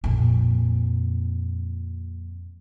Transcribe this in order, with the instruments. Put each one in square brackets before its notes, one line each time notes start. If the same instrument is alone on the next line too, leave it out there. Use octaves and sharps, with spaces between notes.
[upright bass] F2 A#2